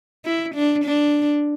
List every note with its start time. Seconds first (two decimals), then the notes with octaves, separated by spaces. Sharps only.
0.25 E4
0.55 D4
0.85 D4